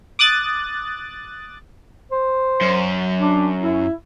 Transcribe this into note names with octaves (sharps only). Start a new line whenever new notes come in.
D6 D#6 F#6 A6
C5
F#2
D4
E4